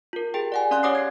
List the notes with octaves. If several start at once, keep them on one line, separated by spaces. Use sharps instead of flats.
F4 A#4
G4 G#4 G5
D5 F#5 G#5
C#4 D5 F5 C6 F#6
G4 C#5 F#5 D6 D#6 C7
G#6 C7